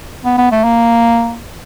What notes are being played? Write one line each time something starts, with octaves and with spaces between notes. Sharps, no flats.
B3
B3
A3
A#3